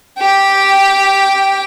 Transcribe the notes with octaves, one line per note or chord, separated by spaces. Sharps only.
G4 G5